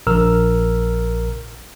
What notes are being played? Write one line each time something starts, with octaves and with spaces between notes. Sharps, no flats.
A#1 A#4 E6 F6